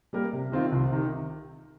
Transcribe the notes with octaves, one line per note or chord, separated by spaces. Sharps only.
G3 A#3 G4 A#4
C3
D#3 C4 F4
C2
C3 D#3